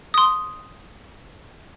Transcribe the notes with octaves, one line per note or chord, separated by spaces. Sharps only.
C6 D#6